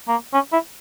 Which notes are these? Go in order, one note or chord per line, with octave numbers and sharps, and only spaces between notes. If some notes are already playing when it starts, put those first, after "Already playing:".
A#3
C#4
E4